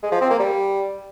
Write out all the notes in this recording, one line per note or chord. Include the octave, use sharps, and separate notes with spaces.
G#3
F3
C4
A#3
G3